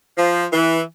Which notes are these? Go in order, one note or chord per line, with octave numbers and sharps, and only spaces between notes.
F3
E3